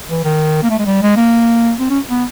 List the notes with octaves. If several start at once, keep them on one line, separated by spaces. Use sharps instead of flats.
E3
D#3
A#3
A3
G#3
G3
G#3
A#3
C4
C#4
B3